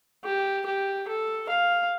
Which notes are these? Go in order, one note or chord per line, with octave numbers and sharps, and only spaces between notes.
G4
G4
A4
F5